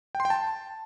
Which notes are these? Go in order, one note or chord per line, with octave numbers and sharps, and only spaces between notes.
G5
C6
G5
A5